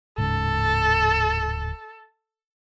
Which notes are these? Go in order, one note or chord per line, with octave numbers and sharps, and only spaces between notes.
D1 G#2 C#3 A4